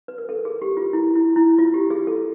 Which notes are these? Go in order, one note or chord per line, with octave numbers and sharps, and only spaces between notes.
B4
A#4
A4
G#4
G4
F4
E4
E4
E4
F4
G4
G#4
A4